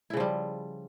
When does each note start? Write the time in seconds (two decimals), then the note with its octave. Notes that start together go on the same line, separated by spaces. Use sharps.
0.10 E4
0.13 C#3
0.17 F3
0.20 G3